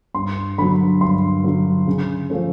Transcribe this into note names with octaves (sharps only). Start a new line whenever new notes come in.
G2 C6
D3 F#3 B5
G2 C6
D3 F#3
C#3
F3 A3 C#4